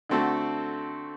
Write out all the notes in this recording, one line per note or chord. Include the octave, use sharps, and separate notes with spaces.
D3 A3 C4 F#4 A4